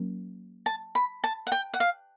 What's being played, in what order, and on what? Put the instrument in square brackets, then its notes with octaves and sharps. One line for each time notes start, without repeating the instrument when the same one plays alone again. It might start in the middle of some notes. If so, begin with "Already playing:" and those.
Already playing: [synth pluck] F#3 A#3 C#4
[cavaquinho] A5
B5
A5
F#5
G5
F#5
F5